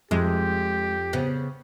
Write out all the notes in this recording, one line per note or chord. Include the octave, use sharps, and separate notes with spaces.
F2 G#3 G4
C#3 B3